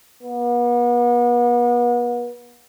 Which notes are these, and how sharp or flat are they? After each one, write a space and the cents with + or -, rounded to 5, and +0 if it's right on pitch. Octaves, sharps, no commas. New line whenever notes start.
B3 -40